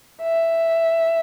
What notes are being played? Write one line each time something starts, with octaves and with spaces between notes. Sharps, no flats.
E5